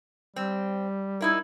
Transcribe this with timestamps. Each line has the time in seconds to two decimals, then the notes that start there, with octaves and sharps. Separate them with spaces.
0.36 G3 C4
1.21 D#4 E4 A#4